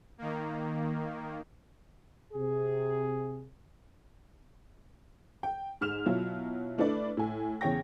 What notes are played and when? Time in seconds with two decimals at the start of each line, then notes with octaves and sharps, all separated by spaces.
0.18 D#3 A#3
2.33 C3 G#4
5.43 G5
5.81 G#2 F6 E7 F7
6.06 B2 F#3 E4 F4
6.78 A3 D4 E4 B4 D5
7.17 A2 G#5
7.61 E2 C#3 C#5 G5 A#6